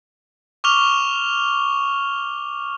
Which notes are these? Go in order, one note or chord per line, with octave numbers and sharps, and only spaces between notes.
C#6 D6 F6 F7 G7